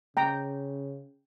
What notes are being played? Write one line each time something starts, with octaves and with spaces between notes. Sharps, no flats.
C#3 G5 A#5